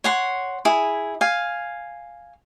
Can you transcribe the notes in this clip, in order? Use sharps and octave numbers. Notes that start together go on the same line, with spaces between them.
C#5 F#5 C6
E4 G#4
F5 G#5